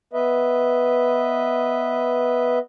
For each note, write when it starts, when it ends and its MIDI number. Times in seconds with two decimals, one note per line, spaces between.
0.13 2.59 59
0.13 2.59 71
0.13 2.59 75
0.13 2.59 76